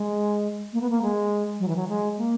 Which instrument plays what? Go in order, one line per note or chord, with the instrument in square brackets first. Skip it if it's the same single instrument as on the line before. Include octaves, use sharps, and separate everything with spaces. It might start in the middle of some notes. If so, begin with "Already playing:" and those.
Already playing: [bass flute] G#3
A#3
B3
A#3
G#3
F#3
E3
F#3
G#3
A#3